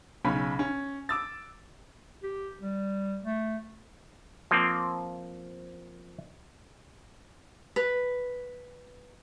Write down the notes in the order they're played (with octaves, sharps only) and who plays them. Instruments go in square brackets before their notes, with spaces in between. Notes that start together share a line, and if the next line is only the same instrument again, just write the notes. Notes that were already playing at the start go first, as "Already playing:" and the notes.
[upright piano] B1 C#3 C#4 B5
C#4
D6 E6 A6
[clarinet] G4
G3
A3
[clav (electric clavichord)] F3 A#3 C4
[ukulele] B4